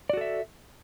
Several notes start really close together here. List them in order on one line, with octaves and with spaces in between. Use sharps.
D5 F#4 A4 E5